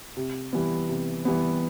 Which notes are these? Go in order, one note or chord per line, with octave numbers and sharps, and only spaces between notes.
C3
E3 G3 B3
C3
E3 G3 B3